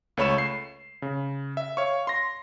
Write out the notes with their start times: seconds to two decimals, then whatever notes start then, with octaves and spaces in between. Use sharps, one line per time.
0.17 C#2 A3 C#5 B5 C#6 E7
0.38 C7
1.02 C#3
1.57 E5
1.77 C#5 F5 C#6
2.07 C6 A#6